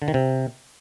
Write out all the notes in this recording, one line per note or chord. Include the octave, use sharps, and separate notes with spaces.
D3
D#3
C3